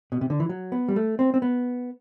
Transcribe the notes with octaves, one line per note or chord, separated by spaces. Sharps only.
B2
C3
D3
E3
F#3
B3
G3
A3
C4
C4
B3